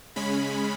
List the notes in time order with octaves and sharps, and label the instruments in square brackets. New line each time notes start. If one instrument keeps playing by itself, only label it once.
[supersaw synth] C#3 G#3 C#4 B5